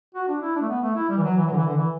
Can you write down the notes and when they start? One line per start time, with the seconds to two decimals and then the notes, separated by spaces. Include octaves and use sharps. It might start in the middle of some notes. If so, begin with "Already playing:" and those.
0.15 F#4
0.28 D4
0.42 E4
0.56 D4
0.62 A3
0.69 B3
0.83 A3
0.96 E4
1.09 G3
1.18 E3
1.23 F#3
1.37 E3
1.47 F#3
1.52 D3
1.56 E3
1.67 D3
1.77 E3